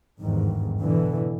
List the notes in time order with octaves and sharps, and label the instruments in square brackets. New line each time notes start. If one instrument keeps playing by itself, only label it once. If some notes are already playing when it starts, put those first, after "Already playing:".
[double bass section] G1 E2 G#2 D#3
B2 D3 E3